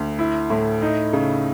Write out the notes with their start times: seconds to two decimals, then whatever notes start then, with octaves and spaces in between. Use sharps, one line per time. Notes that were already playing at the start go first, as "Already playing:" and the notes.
Already playing: D2
0.19 E4
0.50 A2
0.82 D#4
1.13 C#3